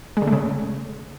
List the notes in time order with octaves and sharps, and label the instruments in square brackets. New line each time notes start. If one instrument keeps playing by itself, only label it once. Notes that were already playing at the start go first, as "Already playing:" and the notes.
[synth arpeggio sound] G#3
D3
A3
C#3